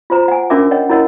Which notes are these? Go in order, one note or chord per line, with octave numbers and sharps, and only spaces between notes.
F4 F#4 C5 A#5
F#5 G#5
C#4 D4 F#4 A#4 E5 D6
C#5 D#5 F#5 G5
E4 F#4 A#4 C#5 D#5 F#5